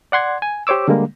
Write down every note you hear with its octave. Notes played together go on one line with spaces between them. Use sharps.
D5 F#5 C6 G#6
G#5
G4 C5 C#5 D6 E6
D3 G3 G#3 A#3